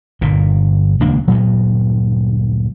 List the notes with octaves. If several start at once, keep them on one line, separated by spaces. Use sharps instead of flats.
G1 G2 A#2
D#1 C#2 A#3 D4
D2 G2 A#2 F#3